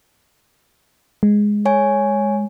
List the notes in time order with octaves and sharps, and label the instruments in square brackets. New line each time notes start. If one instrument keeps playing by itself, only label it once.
[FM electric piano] G#3
[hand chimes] C#5 G#5